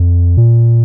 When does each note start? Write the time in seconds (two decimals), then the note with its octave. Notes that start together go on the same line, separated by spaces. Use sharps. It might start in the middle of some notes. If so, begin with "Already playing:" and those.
Already playing: F2
0.37 A#2